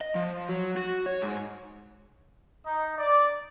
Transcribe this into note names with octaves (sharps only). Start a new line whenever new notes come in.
D#5
F3
F#3
F#4
C#5
G#2
D#4
D5